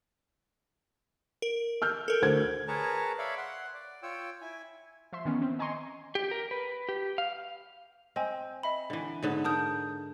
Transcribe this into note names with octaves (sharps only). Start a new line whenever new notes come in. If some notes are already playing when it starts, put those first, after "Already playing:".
A#4
E6 F6 G6
A4 A#4
D2 C5 G#6
G#4 A#4 B4 C#5 A5 A#5
C#5 D5 E5 F5 B5
F#5 C6
D5
F4 C#5 G5 E6
E4 G#5
F3 E5 C6
D#3 E3 B3 C#4
C4
D#5 G#5 A#5 C6 C#6
G4
A#4
B4
G4
F5
C4 D#5 G5 G#5
D#5 E5 B5
D3 E3
G#2 D3 B3
A#4 A5 D#6 G6